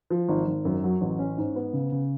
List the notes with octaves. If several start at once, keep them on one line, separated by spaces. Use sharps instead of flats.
F3
G#1
G#1
F#2
F#3
A1
C#4
G#2
B3
C#3
C#3